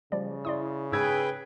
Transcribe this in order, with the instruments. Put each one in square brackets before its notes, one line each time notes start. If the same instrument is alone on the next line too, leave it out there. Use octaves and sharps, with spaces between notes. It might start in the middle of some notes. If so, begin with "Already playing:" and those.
[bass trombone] C#3 [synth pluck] F3 G3 D5
[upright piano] E4 [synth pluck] D5 C6 D#6
[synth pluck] G#2 [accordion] G#4 B4 G5 [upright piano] E6 G#6